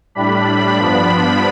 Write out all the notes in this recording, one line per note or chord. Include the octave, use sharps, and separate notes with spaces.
A2 G3 D4 B5
G2 F3 B3 D4 B5